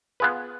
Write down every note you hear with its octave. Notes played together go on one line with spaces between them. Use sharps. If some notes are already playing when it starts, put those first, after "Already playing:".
B3 F4 G#4 B4